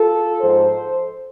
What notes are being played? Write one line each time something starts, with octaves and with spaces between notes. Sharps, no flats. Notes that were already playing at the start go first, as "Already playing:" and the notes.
Already playing: F4 A4
G#2 F3 A4 C5